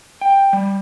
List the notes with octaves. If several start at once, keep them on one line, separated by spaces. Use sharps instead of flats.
G5
G3